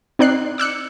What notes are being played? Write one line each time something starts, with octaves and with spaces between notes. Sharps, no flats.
C4 D#4 D5 F#6 C7
D6 E6 F#6 C#7